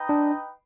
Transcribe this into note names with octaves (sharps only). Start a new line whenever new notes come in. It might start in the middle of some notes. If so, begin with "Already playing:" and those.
Already playing: D#4 B4 D#5 G5
D4